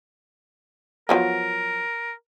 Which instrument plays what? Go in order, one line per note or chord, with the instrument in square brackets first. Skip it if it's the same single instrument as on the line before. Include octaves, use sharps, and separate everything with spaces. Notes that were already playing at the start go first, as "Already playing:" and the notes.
[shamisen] F3 F#3 B3 [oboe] A#4